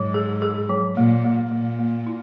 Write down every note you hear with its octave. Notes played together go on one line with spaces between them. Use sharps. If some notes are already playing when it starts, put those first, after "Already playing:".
Already playing: G#2 F#3
G#4
G#4
F#3
A#2 A#3
A#3
A#2 A#3
A#3
E4